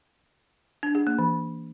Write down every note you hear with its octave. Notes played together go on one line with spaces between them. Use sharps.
D4
G#4
A#3
E3